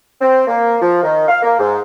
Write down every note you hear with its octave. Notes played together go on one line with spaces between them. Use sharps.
C4
A#3
F3
D#3
F5
A#3
G#2